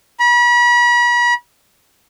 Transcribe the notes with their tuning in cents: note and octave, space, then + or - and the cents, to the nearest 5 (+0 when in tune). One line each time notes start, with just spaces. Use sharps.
B5 -40